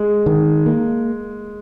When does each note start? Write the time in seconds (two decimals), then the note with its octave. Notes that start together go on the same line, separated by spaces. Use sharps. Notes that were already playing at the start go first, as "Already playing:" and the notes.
Already playing: G#3
0.26 D#3
0.66 A#3